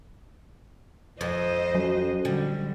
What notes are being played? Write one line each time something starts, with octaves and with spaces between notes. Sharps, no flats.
F2 F3 C5 D#5
F#3 C#4 F#4 A4
D3 G3